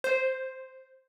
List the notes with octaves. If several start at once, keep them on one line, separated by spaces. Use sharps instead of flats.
C5